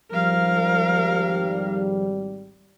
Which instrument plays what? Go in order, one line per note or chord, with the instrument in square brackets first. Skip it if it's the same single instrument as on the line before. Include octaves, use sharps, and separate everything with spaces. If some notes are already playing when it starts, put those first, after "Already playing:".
[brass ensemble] G#1 G#2 G3 [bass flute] F3 [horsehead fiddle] A#4 F5